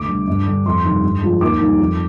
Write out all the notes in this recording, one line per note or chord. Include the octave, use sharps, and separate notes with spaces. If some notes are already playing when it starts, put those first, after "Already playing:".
Already playing: D2 D6
D3 G3
G2
D3 G3
F2 C6
D#3 G3
G2
F3 G#3
D#2 D6
D#3 G3
F2